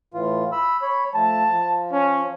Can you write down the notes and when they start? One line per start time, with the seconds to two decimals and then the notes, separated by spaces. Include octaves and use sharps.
0.14 A2 E3 F4
0.52 B5 E6
0.82 C#5 B5
1.14 F3 A3 A5
1.51 F3
1.92 C#4